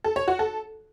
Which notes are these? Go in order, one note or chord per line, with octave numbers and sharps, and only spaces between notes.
A4
C#5
F#4
A4